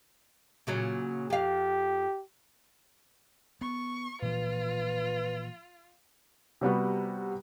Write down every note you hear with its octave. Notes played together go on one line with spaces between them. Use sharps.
A#2 C#3 F#3
F2 G4 F5
B3 C#6
A#2 E3 F3 F4 B4
C3 G3 B3 F#4